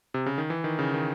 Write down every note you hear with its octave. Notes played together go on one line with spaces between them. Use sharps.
C3
C#3
D#3
E3
D#3
C#3
D#3